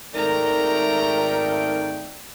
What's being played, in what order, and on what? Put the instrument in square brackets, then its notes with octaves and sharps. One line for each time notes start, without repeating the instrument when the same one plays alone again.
[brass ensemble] G#1 A3 G5 [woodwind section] D#4 D5 [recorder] A#4 [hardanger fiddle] A#5